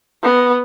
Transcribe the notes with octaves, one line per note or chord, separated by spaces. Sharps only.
B3